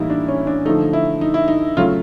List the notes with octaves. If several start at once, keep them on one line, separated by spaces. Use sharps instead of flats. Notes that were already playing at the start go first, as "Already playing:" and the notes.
Already playing: A2 E3 G3 A#3 D#4 E4
D4
C#4
D4
D3 F3 A3 D#4
E4
D#4
E4
D#4
C#3 F#3 A3 F4